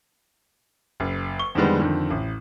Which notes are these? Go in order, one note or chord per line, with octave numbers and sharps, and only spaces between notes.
F#1
C#6 G7
F2 D3 D#3 G3 G#3 B3
F2 D3 D#3
A1